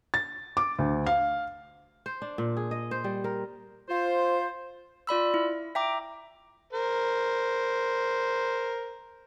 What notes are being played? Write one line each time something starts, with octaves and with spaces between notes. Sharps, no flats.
A6
D6
D2
F5
C5
D4
A#2
G#4
D#5
C5
G3
A#4
F4 C5
F4 D5 B5 E6
E4
E5 G5 A#5 D6
A#4 C5